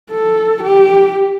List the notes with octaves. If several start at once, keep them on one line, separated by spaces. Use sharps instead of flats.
A4
G4